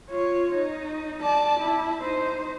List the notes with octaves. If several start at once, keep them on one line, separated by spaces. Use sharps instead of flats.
F4 C#5
D#4
D5 A5
E4
D#4 C5